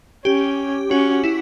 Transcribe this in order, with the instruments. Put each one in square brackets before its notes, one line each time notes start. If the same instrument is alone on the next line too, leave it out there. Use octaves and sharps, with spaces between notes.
[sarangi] C#4 [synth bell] G4
[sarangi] C#4 [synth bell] F#4
[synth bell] E4